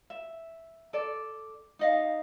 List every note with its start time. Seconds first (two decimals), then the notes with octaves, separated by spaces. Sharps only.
0.10 E5
0.93 A4 D5
1.79 D#4 D#5 F5